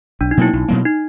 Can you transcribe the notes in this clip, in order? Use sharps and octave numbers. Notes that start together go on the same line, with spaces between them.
B1 D4
D#4
B2 F#3 A#3 E4
B1
B2 F#3 A#3
D#4